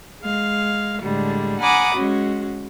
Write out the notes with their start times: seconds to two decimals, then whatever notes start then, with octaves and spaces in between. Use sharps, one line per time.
0.21 G#3 F5
1.01 A2 D3 G3 G#3
1.60 F#5 G#5 A#5 B5 D6 D#6
1.95 G#3 C#4 F#4